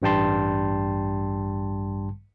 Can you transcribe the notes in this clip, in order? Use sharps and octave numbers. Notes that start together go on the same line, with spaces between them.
A1 G2 G3 G5 A5 C6